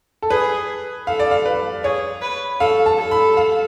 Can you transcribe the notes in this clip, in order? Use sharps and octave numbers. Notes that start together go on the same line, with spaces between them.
A4
G#4 B4
A4 F5
D5
F5
B4
G#4 C#5
B4
A4 F5
A5
A4
B5
F5